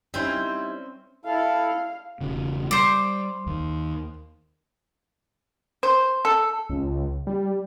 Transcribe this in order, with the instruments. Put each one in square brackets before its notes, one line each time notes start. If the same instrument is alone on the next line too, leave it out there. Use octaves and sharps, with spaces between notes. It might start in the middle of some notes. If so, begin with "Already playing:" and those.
[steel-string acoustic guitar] G3 D#4 E4 [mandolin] C4 C#4 C5
[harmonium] E4 A4 [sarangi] F5
[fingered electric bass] E1 C#3
[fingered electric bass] G3 [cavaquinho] C5 D6
[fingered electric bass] D#2
[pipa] C5
A4
[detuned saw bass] C#2
G3